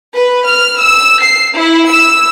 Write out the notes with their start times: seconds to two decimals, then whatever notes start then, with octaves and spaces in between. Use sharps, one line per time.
0.14 B4
0.48 F6
0.79 E6
1.20 C7
1.57 E4
1.89 E6